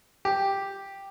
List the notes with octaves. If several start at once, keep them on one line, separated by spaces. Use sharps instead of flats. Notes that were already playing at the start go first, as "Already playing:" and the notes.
G4